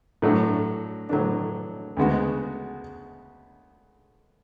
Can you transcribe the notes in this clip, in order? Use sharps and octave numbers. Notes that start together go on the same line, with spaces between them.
A2 F#3 A3 D4
A2 F#3 A3 D4
D2 C#3 G#3 B3 F#4